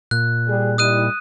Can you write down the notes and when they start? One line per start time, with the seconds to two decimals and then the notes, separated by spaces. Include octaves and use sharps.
0.11 A#2 F#6
0.48 G3 G#4
0.78 G3 D#4 E4 D#6 F#6 D#7